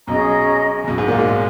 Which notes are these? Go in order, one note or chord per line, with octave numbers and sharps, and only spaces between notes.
B1 B2 C#4 G#4 D#5 A#5
C#3
B1 B2
G#2 G#3
A#2 A#3
G#2 G#3
G#3